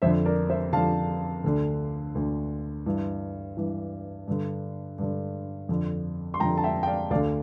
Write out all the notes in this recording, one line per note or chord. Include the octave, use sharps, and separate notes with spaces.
F2 D3 C5 E5
A#4 D5
C5 E5
F2 D3 F5 A5
D2 D3
D2 D3
G2 E3
G2 E3
G2 D3
G2 D3
F2 D3
C6
F2 D3 G5 A#5
A5
E5 G5
G5
D5 F5
D2 D3 D5 F5